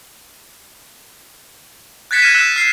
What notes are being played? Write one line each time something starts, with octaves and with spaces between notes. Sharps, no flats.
F#6 G#6 A6 B6 C#7 E7
F6 G#6 A#6 B6 D#7 E7
E6 F#6 A#6 E7
F6 C7